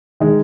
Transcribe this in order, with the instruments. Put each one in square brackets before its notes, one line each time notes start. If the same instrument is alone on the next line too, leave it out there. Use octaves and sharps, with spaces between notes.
[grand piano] D#3 G#3